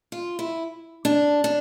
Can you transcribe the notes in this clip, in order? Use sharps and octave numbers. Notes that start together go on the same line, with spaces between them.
F4
E4
D4
D4